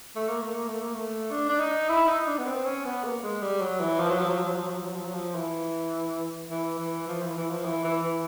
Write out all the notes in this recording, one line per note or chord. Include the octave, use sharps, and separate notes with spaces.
A3
A#3
A3
A#3
A3
A#3
A3
D4
D4
D#4
E4
D#4
D4
B3
C4
C#4
B3
A#3
G#3
G3
F#3
E3
F3
F#3
F3
F#3
F3
F#3
F3
F#3
F3
F#3
F3
F#3
F3
E3
E3
E3
F3
E3
E3
F3
E3
E3
E3